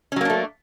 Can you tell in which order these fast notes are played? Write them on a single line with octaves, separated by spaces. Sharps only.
C#4 F#3 A#3 D4 A3